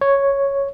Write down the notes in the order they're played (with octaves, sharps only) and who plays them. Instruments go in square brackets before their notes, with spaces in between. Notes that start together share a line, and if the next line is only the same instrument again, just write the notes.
[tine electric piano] C#5